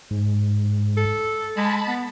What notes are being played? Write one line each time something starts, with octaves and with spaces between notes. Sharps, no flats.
G#2
A4
G#3 A5 B5
B3